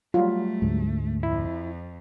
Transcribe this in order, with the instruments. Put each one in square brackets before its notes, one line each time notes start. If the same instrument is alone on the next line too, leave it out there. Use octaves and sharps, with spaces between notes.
[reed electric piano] F#3 G3 [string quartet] A3 [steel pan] F4
[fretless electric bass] D2 G#2
[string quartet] F2 [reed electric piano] E4